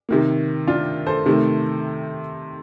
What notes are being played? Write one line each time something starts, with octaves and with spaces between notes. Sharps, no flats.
C3 D#3 A#3
D4 F4
A4 C5
C3 D#3 A3